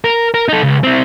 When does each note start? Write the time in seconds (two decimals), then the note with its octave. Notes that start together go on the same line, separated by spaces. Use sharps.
0.04 A#4
0.34 A#4
0.49 D#4 A4
0.63 C#2
0.83 C4 E4